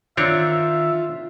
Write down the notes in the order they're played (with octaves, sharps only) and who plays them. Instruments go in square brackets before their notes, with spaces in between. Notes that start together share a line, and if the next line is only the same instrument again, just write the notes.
[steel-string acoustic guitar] D#3 [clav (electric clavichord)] C4 D4 C#5 [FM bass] F4 [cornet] E5